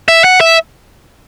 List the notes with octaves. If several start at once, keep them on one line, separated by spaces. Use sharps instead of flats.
E5
F#5
E5